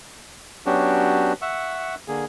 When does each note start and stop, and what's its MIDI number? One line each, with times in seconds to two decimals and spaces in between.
0.66 1.33 54
0.66 1.33 59
0.66 1.33 61
0.66 1.33 62
0.66 1.33 66
0.66 1.33 67
1.42 1.95 76
1.42 1.95 78
1.42 1.95 85
1.42 1.95 88
2.08 2.25 50
2.08 2.25 58
2.08 2.25 68